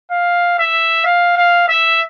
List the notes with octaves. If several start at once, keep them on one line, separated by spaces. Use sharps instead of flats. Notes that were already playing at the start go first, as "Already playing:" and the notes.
F5
E5
F5
F5
E5